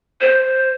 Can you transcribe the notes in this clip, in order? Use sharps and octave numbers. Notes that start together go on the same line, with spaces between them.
C5